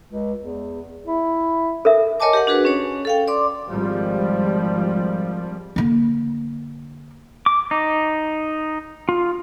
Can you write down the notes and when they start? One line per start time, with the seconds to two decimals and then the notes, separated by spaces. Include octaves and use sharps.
0.08 C#2
0.38 E2
1.07 E4
1.85 A4 A#4 E5
2.20 A#4 C#5 D#5 G#5 A5 D6
2.33 G4 A#4 F#5
2.47 D4 F#4 G#4 B4
2.65 C#4 C#5
3.05 A4 F5 G5
3.28 D5 C6 D6
3.68 G#1 F3 G3
5.76 D3 A#3
7.46 D6
7.71 D#4
9.09 F4